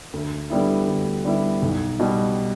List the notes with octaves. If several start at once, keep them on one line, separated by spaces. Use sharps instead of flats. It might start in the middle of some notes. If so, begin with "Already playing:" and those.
D2
D3 G3 B3 E4
D2
D3 G3 B3 E4
B1
B2 G3